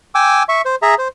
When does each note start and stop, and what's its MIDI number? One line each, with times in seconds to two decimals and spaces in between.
0.15 0.43 79
0.15 0.43 80
0.15 0.43 86
0.15 0.43 88
0.49 0.62 76
0.49 0.62 85
0.65 0.76 72
0.82 0.95 68
0.82 0.95 76
0.82 0.95 82
0.98 1.08 72